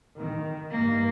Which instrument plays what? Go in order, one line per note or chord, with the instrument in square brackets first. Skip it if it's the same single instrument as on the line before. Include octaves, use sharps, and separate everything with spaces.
[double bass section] D#3
[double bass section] G2 D#3 [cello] A#3